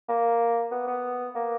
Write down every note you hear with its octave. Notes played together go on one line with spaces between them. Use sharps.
A#3
B3
B3
A#3